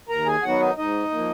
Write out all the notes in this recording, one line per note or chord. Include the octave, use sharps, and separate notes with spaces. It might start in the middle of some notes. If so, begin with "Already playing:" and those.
D#2 A#4 A#5
G#4 G#5
D#3 F#3 B3 F#4 F#5
D#4 D#5
G#2 D#4 D#5
F3 A#3